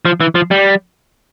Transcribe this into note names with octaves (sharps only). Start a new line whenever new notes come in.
F3
E3
F3
G3